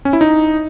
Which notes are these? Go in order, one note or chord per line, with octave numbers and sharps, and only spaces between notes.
C#4
E4
D#4